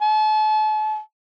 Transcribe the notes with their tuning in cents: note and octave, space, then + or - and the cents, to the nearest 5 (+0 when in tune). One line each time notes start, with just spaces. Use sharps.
A5 -40